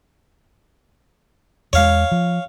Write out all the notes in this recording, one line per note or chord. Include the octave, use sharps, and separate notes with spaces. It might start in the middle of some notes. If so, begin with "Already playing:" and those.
E2 G#3 C#5 F5
F3